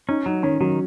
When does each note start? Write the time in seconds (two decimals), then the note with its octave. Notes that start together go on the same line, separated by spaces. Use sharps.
0.09 C#4 D#4
0.26 F#3 D#4
0.43 D#3 C#4
0.60 D#3 F#3